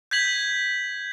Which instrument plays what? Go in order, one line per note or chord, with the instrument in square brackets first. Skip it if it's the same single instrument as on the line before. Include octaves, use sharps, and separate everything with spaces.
[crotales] G6 G#6 B6 F#7